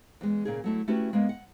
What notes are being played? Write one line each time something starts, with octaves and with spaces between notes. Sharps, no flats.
E2 G#3
A#2 C#3 G#4
F#3 A3 E4
A3 C#4 E4 F#4 G4 B4
G#3 A#3 B3
F#5